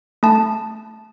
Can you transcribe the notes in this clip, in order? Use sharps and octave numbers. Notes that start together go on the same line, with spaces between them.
A3 A5